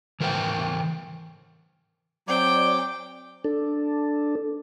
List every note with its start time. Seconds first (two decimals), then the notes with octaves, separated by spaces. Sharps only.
0.20 E3 A#4 C5 G5
2.28 F#3 C4 D5 G5 D6
3.44 D4 A4